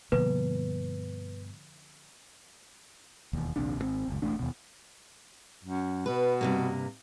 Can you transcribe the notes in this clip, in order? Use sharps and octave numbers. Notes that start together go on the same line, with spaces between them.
G2 B2 D3 F3 A#3 B4
E1 D#2
A#1 D#2 C3 D4
G#1 B2 C4
F#1 C#2
E1 A1 A3 D4
D#2 B2
F#2
B2 B4
G2 C3 A#3